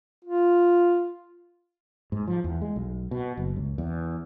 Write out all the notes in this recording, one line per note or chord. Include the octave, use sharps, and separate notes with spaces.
F4
G#2
F3
E2
G#3
B1
B2
F#1
C#2
E2